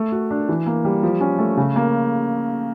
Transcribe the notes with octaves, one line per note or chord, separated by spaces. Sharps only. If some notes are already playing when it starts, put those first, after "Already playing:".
Already playing: A3
F#4
D4
E3
A#3
G3
F3
C#4
A3
C#3
A#3